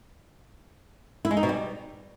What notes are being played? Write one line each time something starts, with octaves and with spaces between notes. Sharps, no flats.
E4
G#3
D#4
B2
G3